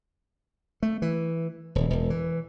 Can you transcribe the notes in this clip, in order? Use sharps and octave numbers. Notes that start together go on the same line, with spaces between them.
A3
E3
D#1
E1
E3